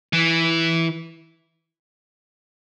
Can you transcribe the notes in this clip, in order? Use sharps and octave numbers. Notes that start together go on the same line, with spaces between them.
E3